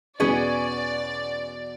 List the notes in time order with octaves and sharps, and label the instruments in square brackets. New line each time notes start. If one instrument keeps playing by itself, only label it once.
[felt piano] E2 B2 [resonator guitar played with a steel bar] C#4 G#4 B4 [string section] D5